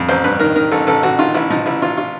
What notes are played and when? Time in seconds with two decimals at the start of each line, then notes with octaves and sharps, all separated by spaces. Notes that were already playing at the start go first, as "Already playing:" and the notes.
Already playing: F2
0.09 A1 C5
0.24 G2 B4
0.40 D#3 A#4
0.56 D#3 A#4
0.72 A1 A4
0.87 A1 A4
1.03 A1 F#4
1.19 D#3 F4
1.35 A1 E4
1.51 F3 D#4
1.66 A1 E4
1.82 A1 F4
1.97 F4